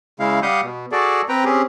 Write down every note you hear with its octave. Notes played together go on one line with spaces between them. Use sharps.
C#3 G#3 E4 F5
G3 G4 F5 F#5 D#6 G6
B2
F#4 G#4 A4 D5
C4 B4 G5 A#5
C4 C#4 G4 G#4